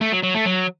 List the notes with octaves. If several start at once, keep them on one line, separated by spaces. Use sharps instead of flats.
A3
F#3
F#3
A3
F#3